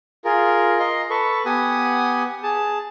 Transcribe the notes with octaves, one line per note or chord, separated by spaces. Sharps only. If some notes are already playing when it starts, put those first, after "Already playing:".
F4 G#4 A#4
D#5 A#5 C6
A4 B4 C#6
B3 G4 F#5 G#5 D#6
G#4 A5